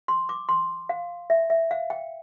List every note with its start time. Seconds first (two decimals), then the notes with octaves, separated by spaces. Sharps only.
0.08 C6
0.29 D6
0.49 C6
0.89 F5
1.30 E5
1.50 E5
1.71 F5
1.90 G5